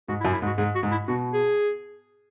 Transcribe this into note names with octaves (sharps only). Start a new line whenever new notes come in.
G#2 F#4
E4
F#2
E4
G#2
F#4
G#2 G#4
F#4
G#2
E4
B2 F#4
G#4